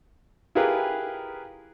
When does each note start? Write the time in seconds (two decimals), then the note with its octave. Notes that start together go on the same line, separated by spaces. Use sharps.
0.55 E4 F4 G4 G#4 A#4 B4